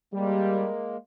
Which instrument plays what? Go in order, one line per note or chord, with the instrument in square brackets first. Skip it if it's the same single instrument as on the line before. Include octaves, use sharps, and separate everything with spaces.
[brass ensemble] G3 [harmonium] G#3 A#3